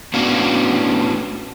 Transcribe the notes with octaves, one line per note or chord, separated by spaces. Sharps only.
A2 B3 C#4 D4 F#4 F5